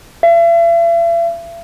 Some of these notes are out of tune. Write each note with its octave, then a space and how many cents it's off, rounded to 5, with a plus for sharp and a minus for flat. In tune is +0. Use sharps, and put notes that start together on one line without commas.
E5 +45